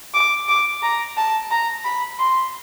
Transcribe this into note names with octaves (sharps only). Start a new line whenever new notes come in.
D6
D6
A#5
A5
A#5
B5
C6